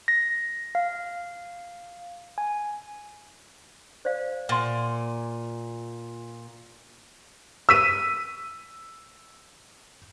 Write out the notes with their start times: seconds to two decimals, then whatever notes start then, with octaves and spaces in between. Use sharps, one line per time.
0.08 A#6
0.75 F5
2.38 G#5
4.05 C5 D5 F5
4.49 A#2 F#5 C6
7.69 E6 B6 D#7